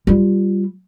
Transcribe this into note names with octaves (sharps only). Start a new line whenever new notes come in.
G3 F4